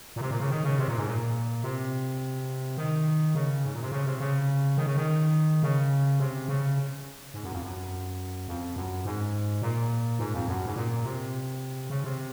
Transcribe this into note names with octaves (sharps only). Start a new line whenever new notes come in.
A#2
C3
A#2
C#3
D#3
C#3
C3
A#2
G#2
A#2
C3
D#3
C#3
G#2
A#2
C3
C#3
C3
C#3
D#3
C#3
D#3
C#3
C3
C#3
G#2
F#2
F2
F#2
F2
F#2
G#2
A#2
G#2
F2
F#2
G#2
A#2
C3
C#3
C3